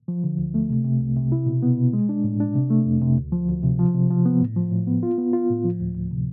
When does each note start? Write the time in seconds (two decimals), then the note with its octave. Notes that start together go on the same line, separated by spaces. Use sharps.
0.08 F3
0.24 D3
0.38 D2
0.54 A3
0.70 C3
0.85 C3
1.01 C2
1.16 C3
1.32 E4
1.46 B2
1.63 B3
1.77 B2
1.93 G#3
2.09 D4
2.24 A2
2.40 D4
2.55 C3
2.70 A3
2.86 F2
3.01 C3
3.18 D2
3.32 F3
3.48 D2
3.63 C3
3.79 F3
3.94 C3
4.10 F3
4.26 B3
4.41 A2
4.56 F3
4.71 A2
4.87 B3
5.03 F4
5.18 B3
5.33 F4
5.50 A2
5.64 F3
5.80 D2
5.95 D2
6.11 C3